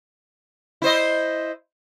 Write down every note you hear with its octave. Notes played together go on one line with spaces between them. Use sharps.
E4 C5 D#5